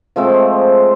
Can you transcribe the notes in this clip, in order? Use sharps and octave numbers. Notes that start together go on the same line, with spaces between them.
F3 G#3 A3 C4